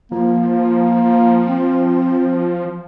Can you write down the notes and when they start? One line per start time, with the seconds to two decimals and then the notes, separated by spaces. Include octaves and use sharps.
0.12 F3 A#3
1.47 C4